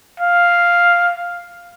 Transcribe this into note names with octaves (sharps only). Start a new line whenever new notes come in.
F5